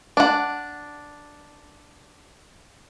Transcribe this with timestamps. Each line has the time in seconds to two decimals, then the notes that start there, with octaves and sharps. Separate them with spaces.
0.17 D4 F#5